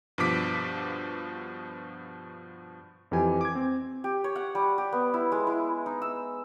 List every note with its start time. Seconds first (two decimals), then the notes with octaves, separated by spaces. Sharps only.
0.18 G2 B2 F3 D6 B6
3.11 F2 E3 G4 G#5
3.41 D6 G#6
3.55 C4
4.04 G4
4.24 C#5
4.35 F#5
4.55 G3
4.78 G4
4.93 B3
5.14 E4
5.32 G#3
5.47 E4
5.86 D#4
6.02 E6